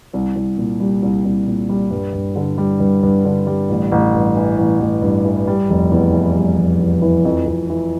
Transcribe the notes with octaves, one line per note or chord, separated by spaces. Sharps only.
C2
C2
A#2
G3
C2
C2
A#2
G3
G2
G2
D3
G3
G2
G2
D3
G3
A1
A1
G2
E3
A1
A1
G2
E3
G3
F1
E2
E3
G3
F1
E2
E3
F2
F2
E3